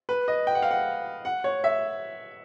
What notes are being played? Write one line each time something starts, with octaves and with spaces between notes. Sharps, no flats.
B4
D#5
G5
F#5
F5
F#5
F#5
C#5
E5